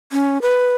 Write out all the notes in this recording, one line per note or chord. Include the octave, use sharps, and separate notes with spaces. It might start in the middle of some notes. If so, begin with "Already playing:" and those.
C#4
B4